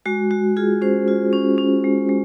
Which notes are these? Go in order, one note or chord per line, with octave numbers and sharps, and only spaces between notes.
G#3 F#4
G#3 F#4
F4 G#4
C#4 C5
F4
C#4
C#4
G#3
G#3